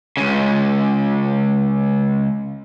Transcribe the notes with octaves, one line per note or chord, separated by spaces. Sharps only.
C#2 C#3